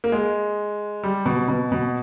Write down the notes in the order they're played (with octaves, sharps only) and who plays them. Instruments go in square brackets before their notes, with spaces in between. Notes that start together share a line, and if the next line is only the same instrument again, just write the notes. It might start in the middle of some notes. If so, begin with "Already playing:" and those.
[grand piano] A#3
G#3
G3
B2
B2
B2